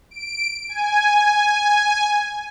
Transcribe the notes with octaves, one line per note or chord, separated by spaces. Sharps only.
D7
G#5